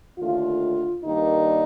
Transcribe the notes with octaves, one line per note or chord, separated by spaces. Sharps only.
D#2 D3 A3 F4
G2 D#3 G3 A#3 D#4